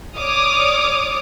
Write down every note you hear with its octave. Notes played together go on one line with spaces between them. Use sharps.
C#5 D5 D6 D#6 F6